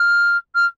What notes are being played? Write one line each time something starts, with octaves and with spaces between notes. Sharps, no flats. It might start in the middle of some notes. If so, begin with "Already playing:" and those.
Already playing: F6
F6